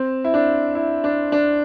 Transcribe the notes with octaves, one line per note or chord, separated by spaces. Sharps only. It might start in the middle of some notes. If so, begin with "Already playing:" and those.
Already playing: C4
E4
D4
E4
D4
D4